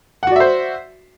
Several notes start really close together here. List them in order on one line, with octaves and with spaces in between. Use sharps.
F#5 F#4 D5 E5 C5